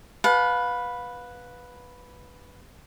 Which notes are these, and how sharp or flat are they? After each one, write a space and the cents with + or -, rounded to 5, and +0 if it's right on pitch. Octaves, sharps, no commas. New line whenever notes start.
B4 +0 F5 +35 A5 -30